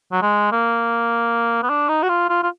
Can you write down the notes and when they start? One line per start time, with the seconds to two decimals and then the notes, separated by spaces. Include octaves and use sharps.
0.12 F#3
0.22 G#3
0.52 A#3
1.63 B3
1.69 D4
1.89 D#4
2.03 F#4
2.09 F4
2.29 F4
2.43 F4